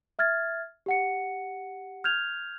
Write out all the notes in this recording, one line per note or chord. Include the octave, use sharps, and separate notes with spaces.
E5 F6 G#6 A6
G4 F#5 C#7
F6 G6 G#6 F7